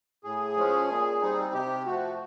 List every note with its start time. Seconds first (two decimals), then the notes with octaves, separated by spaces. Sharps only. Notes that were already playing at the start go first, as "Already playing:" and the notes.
0.24 A2 G#4
0.56 F3 G#3 C#4
0.89 A#2
1.21 G3 C4 D#4
1.53 C3 G4
1.86 F3 A3 F#4